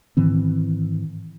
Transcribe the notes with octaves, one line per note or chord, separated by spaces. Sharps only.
G#2 D#3 E3 C4